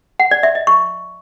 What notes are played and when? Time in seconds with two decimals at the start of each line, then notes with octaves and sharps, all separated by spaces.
0.20 F#5
0.31 D5
0.43 E5
0.55 D#5
0.67 C#6